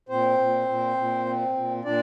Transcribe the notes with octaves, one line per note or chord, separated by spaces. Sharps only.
A#2 C4 C5
A#2
A#2
A#2
C4
A#2
A#2 D4 D5